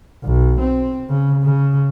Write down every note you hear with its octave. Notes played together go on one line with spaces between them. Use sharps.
B1
C4
C#3
C#3